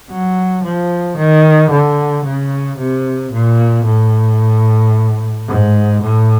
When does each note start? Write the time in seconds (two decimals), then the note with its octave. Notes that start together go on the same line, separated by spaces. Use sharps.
0.10 F#3
0.64 F3
1.17 D#3
1.71 D3
2.25 C#3
2.79 C3
3.32 A#2
3.86 A2
5.48 G#2
6.02 A2